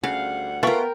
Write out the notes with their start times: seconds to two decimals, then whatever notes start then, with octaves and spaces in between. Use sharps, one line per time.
0.04 D2 C#3 G3 F5 F#5
0.63 A3 B3 F4 A#4 F#5 G5 C#6